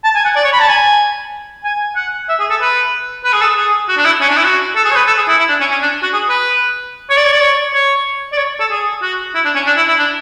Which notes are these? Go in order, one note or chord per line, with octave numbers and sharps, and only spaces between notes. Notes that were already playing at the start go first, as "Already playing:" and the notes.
A5
G#5
F#5
D5
C#5
B5
A5
G#5
G#5
F#5
E5
G#4
A4
B4
B4
G#4
A4
G#4
F#4
D4
E4
C#4
D4
E4
F#4
A4
G#4
C#5
B4
A4
G#4
E4
E4
D4
C#4
C#4
D4
F#4
G#4
B4
C#5
D5
C#5
D5
C#5
C#5
D5
C#5
A4
G#4
F#4
E4
D4
C#4
D4
E4
E4
D4